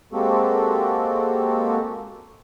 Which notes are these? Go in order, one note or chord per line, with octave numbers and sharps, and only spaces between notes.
G#3 A#3 C4 F#4 G4 A4